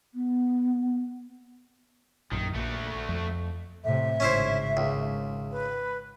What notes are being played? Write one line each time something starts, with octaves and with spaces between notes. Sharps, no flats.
B3
A#1 F#2 D#3
A#1 A3 F#4
F2
A2 C3 E5
G#1 C#3 C#4 E4 C5
C#2
B4